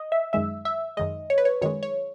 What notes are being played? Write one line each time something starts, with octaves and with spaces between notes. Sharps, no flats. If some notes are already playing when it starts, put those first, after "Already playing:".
Already playing: D#5
E5
F#2 D#3 G#3 E5
E5
F#2 D#3 G#3 D#5
C#5
B4
C#5
F#2 D#3 G#3 C#5
C#5